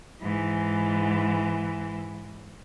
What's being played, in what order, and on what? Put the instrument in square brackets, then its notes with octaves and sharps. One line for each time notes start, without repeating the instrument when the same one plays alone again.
[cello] G#2 E3